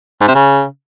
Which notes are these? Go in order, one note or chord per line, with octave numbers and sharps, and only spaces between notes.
G#2
C3
C#3